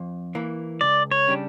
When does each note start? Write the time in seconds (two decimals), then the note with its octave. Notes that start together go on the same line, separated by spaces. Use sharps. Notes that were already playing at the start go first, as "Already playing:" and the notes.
Already playing: F2
0.35 E3 A#3
0.81 C#2 D5
1.11 C#5
1.28 C#3 G3 D4 G4